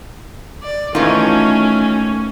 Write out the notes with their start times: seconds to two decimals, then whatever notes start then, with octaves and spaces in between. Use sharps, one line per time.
0.63 D5
0.95 D#3 E3 A3 C#4 F4